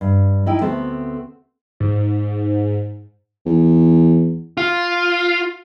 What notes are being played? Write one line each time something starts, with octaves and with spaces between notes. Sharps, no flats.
G2
D#4 E4 G5
D2 A3 B3 C4 A4
G#2
E2
F4